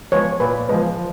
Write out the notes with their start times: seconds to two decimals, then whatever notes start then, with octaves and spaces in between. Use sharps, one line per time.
0.12 F3 G#3 B3 C#5
0.40 A#2 B4
0.68 F3 G#3 B3
0.97 F3